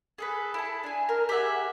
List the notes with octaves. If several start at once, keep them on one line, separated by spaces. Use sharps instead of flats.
G#4 A4 B4
E4 A5
D4 G#5
A#4
G4 G#4 E5 F#5